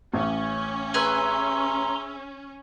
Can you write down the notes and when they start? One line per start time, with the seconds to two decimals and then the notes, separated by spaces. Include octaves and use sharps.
0.13 A1 C#4
0.94 G#4 B4 E5 A#5 C6